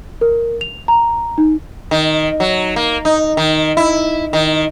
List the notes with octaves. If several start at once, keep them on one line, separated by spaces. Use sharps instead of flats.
A#4
F7
A#5
D#4
D#3
F#3
A#3
D#4
D#3
E4
D#3